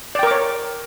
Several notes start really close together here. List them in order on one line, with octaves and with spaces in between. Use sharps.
D5 G5 A#4 D6 C#5